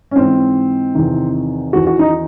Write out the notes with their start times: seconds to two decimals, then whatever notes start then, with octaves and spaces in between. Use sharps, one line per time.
0.11 C#4
0.16 G#2 E3 C4
0.95 E2 C3 D#3
1.73 E2 D#3 F#4
1.87 F#4
1.99 D#4